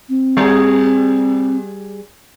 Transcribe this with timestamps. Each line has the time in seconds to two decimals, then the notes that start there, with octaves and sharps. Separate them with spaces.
0.09 C4
0.37 G3 G#4